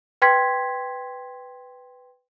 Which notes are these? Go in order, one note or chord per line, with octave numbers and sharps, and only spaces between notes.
B4 G5 C6 G#6 B6